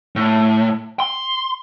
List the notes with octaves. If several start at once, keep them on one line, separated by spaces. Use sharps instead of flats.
A2
C6